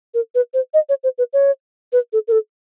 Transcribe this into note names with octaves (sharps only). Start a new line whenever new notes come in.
A#4
B4
C5
D#5
C#5
C5
B4
C#5
B4
A4
A#4
A4